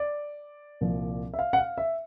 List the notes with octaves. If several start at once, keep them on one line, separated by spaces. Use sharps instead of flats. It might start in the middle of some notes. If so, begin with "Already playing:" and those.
Already playing: D5
C2 A#2 F3
E5
F5
F#5
F5
E5